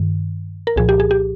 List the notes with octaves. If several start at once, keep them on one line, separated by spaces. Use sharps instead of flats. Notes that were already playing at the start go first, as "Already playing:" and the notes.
Already playing: G2 D#3
A#4
C2 A#2 F3 G#4
G4
G#4
G4